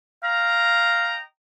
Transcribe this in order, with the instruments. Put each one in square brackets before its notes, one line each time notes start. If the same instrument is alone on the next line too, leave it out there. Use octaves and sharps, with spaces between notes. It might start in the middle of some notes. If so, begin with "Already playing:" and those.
[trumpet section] D#5 G5 A#5 [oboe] F5